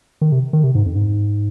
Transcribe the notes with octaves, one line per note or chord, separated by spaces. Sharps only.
D#3
C3
D#3
C3
G#2
F2
G#2